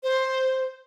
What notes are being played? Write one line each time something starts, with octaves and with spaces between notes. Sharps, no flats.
C5